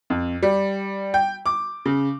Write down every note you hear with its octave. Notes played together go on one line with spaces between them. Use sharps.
F2
G3
G5
D6
C#3